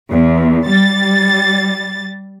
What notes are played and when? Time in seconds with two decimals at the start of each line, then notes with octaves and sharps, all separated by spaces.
0.10 E2
0.67 G3 A6